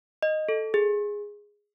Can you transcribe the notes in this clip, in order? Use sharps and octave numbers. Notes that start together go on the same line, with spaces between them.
D#5
A4
G#4